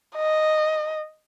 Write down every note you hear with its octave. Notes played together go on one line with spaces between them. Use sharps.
D#5